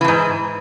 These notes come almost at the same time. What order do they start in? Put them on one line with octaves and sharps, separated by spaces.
E3 F2 G#2